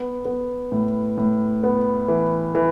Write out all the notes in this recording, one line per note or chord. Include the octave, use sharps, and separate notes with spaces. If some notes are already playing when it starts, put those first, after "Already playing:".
Already playing: B3
B3
A2
A2
B3
E3
E3